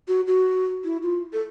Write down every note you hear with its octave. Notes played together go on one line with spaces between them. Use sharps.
F#4
F#4
E4
F4
A4